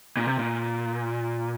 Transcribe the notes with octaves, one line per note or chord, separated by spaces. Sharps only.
A#2
C3
A#2